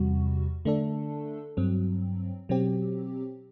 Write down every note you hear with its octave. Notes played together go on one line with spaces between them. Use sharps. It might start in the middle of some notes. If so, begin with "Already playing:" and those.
Already playing: E2 C3 G3 F#4
D3 A3 D4 A4
G2 F#3 C4
B2 F#3 C4 G4